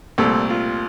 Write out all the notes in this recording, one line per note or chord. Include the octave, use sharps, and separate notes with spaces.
C2 A#2 A3 C4 A4
F4